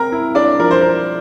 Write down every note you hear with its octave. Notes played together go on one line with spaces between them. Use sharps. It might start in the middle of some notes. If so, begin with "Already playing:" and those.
Already playing: C4 A#4 A#5
E4
D4 D5
F3 A#4
C5
A#4